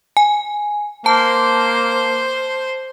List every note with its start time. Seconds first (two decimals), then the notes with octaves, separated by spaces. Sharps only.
0.17 G#5
1.06 A#3 C5 A5